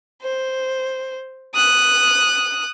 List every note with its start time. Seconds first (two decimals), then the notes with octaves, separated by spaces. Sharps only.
0.22 C5
1.55 D#6 F#6